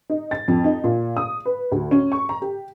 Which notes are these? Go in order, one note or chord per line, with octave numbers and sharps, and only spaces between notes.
D#4
A6
F2
D#4
A#2
D#6
B4
D2
C#4
C#6
A#5
G4